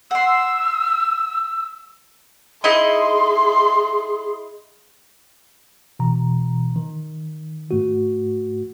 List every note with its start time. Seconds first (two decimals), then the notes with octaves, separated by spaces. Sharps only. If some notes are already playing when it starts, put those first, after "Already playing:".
0.11 F#5 C6 E6
2.64 D#4 E4 G#4 D#5 C6
5.99 B2 E3 A#5
6.76 D#3
7.71 G#2 A3 F#4